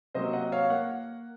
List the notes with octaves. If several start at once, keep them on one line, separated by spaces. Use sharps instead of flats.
C3 F#3 A#3 C5 D#5
D#5 F#5
C#5 F5
A#3 F#5